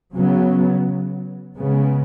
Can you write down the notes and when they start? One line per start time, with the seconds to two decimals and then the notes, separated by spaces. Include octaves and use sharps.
0.15 C#3 F#3 B3
1.57 C#3 G#3 B3